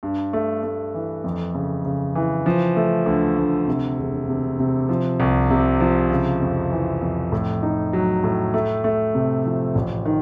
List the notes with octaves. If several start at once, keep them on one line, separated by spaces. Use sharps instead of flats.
G2
A3
A3
E3
F2
C#3
C#3
E3
F3
A3
D2
D2
C3
E1
C3
C3
F3
C2
C3
F3
C#3
F2
E3
F2
A2
D#4
F#3
A2
A3
A3
C3
F3
A1
D#3